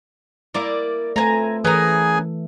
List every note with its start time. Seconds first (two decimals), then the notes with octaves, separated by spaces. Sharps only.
0.54 A#3 E4 A#4 D5
1.16 A3 C4 F4 B4 G#5 A#5
1.65 E3 B3 C#4 G#4 A#4 G#5 A#5